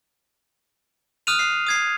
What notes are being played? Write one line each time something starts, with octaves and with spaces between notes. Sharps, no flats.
D#6 F6 F#6 D#7 F7
C7
D#6 G#6 C7